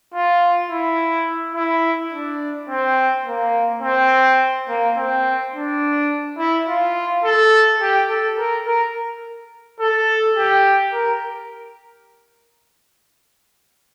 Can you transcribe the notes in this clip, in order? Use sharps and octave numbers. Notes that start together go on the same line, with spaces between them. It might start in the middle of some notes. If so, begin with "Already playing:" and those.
F4
E4
E4
D4
C4
A#3
C4
A#3
C4
D4
E4
F4
A4
G4
A4
A#4
A#4
A4
G4
A#4